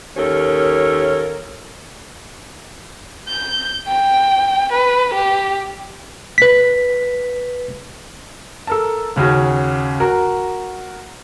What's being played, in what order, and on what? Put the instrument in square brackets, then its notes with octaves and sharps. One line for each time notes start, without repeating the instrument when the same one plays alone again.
[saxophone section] D#2 C#4 A4 A#4 C#5
[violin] G6
G5
B4
G4
[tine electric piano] B4 B6
[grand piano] A4 A#4 A5
D#2 C#3 C#4 F#4
F#4 A#4